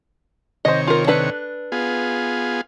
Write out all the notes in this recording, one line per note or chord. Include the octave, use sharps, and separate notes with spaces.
C3 D#3 C5 C#5 D#5
F4 A#4
D4 A4 B4
B3 F4 G#4